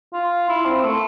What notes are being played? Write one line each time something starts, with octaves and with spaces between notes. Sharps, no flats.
F4
E4
C4
A3